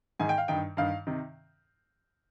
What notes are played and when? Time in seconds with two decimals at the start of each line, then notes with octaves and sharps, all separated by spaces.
0.20 G#2 D#3 G#5
0.29 G5
0.38 F5
0.48 G2 D#3 G5
0.77 G2 D#3 F5
1.07 C3 D#3